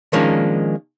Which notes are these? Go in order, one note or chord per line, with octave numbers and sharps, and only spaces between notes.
D#3 F3 G#3 A#3 C#4 D4